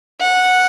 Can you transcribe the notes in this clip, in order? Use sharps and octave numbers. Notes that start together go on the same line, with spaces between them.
F#5